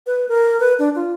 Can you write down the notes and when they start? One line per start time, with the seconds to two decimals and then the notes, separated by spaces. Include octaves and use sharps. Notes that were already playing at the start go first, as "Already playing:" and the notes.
0.06 B4
0.28 A#4
0.60 B4
0.79 D4
0.95 F4